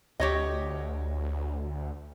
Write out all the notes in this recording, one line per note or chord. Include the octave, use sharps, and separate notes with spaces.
D2 G4 C#5 D#5